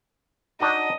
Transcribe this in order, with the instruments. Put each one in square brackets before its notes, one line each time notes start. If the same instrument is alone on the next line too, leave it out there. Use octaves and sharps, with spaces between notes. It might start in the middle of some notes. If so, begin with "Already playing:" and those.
[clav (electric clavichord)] D4 D#4 F#4 [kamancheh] D#5